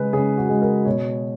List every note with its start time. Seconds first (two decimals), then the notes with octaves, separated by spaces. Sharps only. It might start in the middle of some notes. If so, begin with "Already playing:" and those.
Already playing: C#3 G#3 B4
0.13 C#3 G#4
0.37 F#4
0.49 G#3
0.62 A#4
0.85 B2 C#5